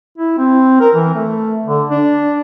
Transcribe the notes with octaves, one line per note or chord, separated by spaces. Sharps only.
E4
C4
A#4
E3
A3
D3
D4